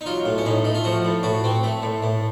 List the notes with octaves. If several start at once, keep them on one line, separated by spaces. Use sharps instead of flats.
D#4
F#3 F4
A2
C#4
A2 D#4
A3
F4
F3 F#4
A2
A2 F#4
C4
A3
A2
A2